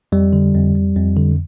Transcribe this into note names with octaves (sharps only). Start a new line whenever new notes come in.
F2 G3
D3
F2
F2
F2
D3